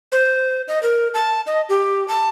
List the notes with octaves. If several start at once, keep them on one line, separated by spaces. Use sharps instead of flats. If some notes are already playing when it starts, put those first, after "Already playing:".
C5
D#5
A#4
A5
D#5
G4
A5